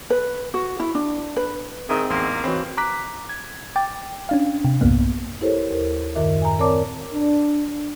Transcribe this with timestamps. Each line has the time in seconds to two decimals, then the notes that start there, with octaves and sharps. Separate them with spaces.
0.10 B4
0.54 F#4
0.80 E4
0.95 D4
1.37 B4
1.89 G#2 D#3 C4 G#4 E5 A#5 D#6
2.10 A1 E2 A#3 C6
2.44 G#2 C#3 E3 C4 F#4 B5
2.77 A#5 D6 F#6 B6
3.29 G#6
3.76 G5 D6 A6
4.29 C#4 D4 F5
4.65 C3
4.81 B1 E2 G2 A#3 B3
5.41 E4 G4 A4 A#4 C5 C#5
5.71 D#2 A#4 C5
6.15 F#2 A2 D#3 A#4 E5 D6
6.42 G#5 A#5
6.59 C4 A#4 C#5 D5 A5 D6
7.13 D4